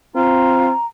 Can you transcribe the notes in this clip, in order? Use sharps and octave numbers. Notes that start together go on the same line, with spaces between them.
C4 F4 A#5